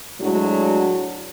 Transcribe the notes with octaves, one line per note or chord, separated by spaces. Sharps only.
A2 F#3 G#3 D4 F#4